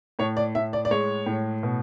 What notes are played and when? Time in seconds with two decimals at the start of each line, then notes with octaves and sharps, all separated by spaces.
0.19 A2 C#5
0.37 D5
0.55 A2 E5
0.73 D5
0.85 D5
0.91 G#3 C#5
1.26 A2
1.63 B2